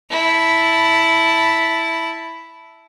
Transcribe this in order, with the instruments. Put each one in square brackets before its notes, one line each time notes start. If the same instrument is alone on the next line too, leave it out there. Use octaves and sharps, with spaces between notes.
[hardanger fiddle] E4 A5